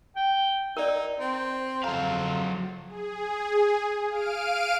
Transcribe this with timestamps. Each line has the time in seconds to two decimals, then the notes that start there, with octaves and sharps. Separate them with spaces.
0.16 G5
0.77 D#4 A#4 D5
1.20 C4
1.84 F2 F#3 F5 A#5
2.86 G#4
4.09 F5 F6 D7 D#7